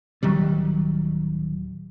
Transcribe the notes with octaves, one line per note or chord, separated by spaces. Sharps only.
D1 D#3 F#3 G3